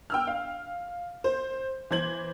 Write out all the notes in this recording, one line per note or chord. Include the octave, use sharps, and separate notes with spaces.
G5 E6 F6
F5
C5
E3 C5 G#6 F#7